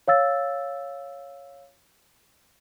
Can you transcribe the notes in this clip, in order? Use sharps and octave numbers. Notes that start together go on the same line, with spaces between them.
C#5 F5 E6 A6